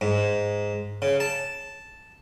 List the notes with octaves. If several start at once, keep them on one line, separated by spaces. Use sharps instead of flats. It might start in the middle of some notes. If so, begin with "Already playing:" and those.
G#2
C#3
A5